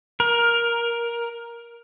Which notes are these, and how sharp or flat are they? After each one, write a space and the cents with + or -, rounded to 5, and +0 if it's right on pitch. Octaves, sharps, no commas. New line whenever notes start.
A#4 +10